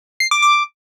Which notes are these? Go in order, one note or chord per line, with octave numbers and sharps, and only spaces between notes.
C7
D6
D6